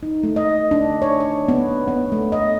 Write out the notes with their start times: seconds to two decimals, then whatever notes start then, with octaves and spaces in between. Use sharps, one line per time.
0.03 D#4
0.23 A3
0.36 D#5
0.71 D4
1.02 C#5
1.20 C#5
1.48 B3
1.88 B3
2.12 A3
2.32 D#5